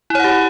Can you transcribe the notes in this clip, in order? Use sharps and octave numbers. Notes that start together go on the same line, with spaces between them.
E4 G4 C#5 F#5